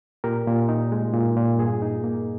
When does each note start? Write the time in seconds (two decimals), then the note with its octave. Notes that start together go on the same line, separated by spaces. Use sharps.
0.24 A#2 G4 A#4
0.47 A#2
0.69 D#4
0.92 G#3
1.14 A#2
1.36 A#2
1.59 G2 G#4
1.82 D#4
2.04 A#3